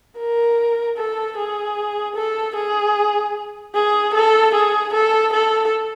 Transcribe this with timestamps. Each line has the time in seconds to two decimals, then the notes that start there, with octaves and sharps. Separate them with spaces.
0.17 A#4
0.97 A4
1.37 G#4
2.15 A4
2.55 G#4
3.75 G#4
4.14 A4
4.54 G#4
4.93 A4
5.33 A4